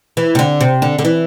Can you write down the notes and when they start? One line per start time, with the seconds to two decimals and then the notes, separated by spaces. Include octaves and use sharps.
0.17 E3
0.35 C3
0.39 D3
0.61 C3
0.82 D3
0.98 D3
1.05 E3